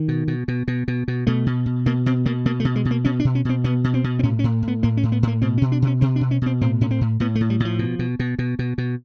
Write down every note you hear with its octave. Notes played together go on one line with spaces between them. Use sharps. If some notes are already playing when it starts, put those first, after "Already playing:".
Already playing: D#3
B2
B2
B2
B2
B2
B2
B2 A3
B2
B2
B2 A#3
B2 C4
B2 A#3
B2 A#3
A3
B2
G#3
B2
A#3
B2 C#4
D4
B2
C#4
B2 C4
B2 B3
B2
C4
B2
C4
A2 C#4
C#4
A2
A2
B3
A2 A#3
C#4
A2
B3
A2 A#3
B2 C4
C#4
B2
D4
B2 C#4
B2 C4
D4
B2
C#4
B2 C4
A2 C4
A2 C#4
C4
A2
A2 B3
A3
A2
G3
A2 F3
B2
B2
B2
B2
B2
B2